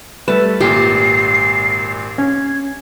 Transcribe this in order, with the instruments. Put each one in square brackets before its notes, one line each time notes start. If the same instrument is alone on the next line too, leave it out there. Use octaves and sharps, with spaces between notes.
[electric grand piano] G3 A3 [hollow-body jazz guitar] B4 [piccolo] E5 [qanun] A5
[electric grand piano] G#1 A#2 [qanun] G4 [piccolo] C7
[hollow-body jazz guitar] C#4 [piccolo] G#6